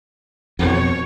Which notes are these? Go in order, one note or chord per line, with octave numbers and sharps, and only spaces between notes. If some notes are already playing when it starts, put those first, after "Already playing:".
F2 B2 C#5